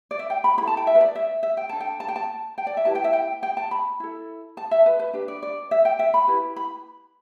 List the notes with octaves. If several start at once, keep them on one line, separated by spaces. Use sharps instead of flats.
D5
E5
G5
B5
E4 A4 B5
A5
G5
E5
B4
D5
E5
E5
G5
D4 A4 A5
G5
A5
G5
A5
G5
D5
E5
E4 G4 B4 A5
G5
E5
G5
G5
A5
B5
E4 A4
A5
E5
B4
B4
D4 G4 B4
D5
D5
E5
G5
E5
B5
E4 G4 B4
B5